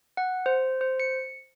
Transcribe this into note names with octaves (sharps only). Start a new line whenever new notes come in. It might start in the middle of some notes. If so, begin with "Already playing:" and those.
F#5
C5
C5
C#7